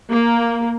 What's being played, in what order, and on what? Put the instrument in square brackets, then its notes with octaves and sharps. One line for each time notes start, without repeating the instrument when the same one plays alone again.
[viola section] A#3